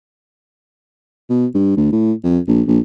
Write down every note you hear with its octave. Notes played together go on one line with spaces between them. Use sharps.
B2
G2
D2
A2
F2
A#1
A#1